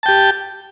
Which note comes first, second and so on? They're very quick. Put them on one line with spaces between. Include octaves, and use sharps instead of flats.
A5 G5 G4